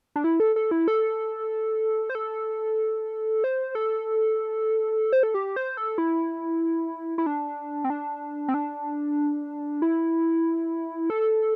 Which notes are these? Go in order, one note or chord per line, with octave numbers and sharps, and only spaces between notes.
D4
E4
A4
A4
E4
A4
C5
A4
C5
A4
C5
A4
G4
C5
A4
E4
E4
D4
C4
D4
C4
D4
E4
A4